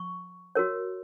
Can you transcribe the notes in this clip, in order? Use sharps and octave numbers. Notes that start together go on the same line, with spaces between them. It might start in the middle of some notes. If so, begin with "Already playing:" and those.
Already playing: C#6
F#4 A#4 C#5